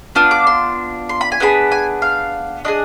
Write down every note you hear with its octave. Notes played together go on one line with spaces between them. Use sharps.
B3 D4 F4 D#6
D6
C6
C6
B5
G#5
B3 D4 G#4 B5
G#5
F5
D4 F4 G#4 D#5